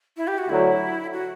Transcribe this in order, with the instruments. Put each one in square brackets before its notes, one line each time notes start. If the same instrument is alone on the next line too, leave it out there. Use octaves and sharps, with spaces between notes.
[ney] E4
G4
F#4
[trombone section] D2 D3 F#3 [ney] E4
[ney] F#4